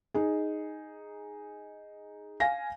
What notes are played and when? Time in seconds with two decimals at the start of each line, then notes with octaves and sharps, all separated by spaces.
0.14 D#4 G#4
2.40 F5 G#5 A#6